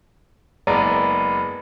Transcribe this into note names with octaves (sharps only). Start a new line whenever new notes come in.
F#1 G#3 B3 D5 A#5